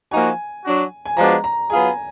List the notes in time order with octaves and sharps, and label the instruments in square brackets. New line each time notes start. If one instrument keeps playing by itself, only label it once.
[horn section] F3 A#3 D#4 F#4 [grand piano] G#5
[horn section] F#3 D4 F#4
[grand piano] G#5
[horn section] F3 G#3 B3 D4 F#4 [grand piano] A#5
[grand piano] A#5
[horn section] F#3 B3 F4 G#4 [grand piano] G#5